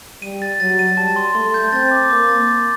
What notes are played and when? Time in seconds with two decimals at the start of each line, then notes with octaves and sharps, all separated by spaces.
0.22 G3 D#7
0.42 A6
0.60 F#3 A6
0.79 D#7
0.97 G3 A5
1.16 C6
1.35 A3 C6
1.54 G6
1.73 C4 A6
1.91 D6
2.10 A#3 D6
2.29 A6
2.48 A6